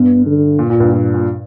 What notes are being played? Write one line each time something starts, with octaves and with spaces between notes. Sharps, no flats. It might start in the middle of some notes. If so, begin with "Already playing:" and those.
Already playing: G2 B3
D3
A#2
A#2
G2
A#2
A#2